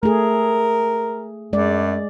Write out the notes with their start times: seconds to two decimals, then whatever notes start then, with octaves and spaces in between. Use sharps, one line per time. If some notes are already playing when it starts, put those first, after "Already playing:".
0.03 A3 G#4 A#4
1.53 F#2 G#3 D5